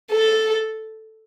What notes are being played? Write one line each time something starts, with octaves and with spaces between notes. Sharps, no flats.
A4